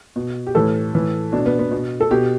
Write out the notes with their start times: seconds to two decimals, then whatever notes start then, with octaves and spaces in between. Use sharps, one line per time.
0.16 B2
0.47 G4
0.55 A2 E3 A4
0.93 A2 E3
1.32 B2 D4
1.46 B3
1.59 B3
1.71 B2
2.00 A4
2.11 B2 G4